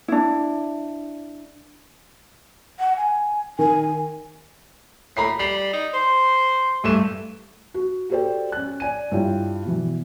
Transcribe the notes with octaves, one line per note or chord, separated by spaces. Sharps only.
D4 E4
F#5
G#5
D#3 G#5
A2 A#5 B5 C7
G3 D5 C7
D#4
C5 C6
G2 E3 A3 G4 E7
F#4
F#4 G4 A4 C5 D5 G5
C#4 F#6
D5 G#5 D#7
G2 E4 F4 C#5 G5
B2 E3